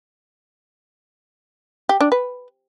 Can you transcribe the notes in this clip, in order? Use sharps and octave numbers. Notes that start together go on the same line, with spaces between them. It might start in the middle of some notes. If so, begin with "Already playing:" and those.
G4
D4
B4